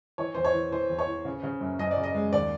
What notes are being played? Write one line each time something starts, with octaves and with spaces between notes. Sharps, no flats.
E3 C#5
E2 C5
C#5
E3
E3 C5
E2
C#5
E3
C#3
C#3
F#2
F#2 D#5
D5
C#3
D#5
G#3
D#2 D5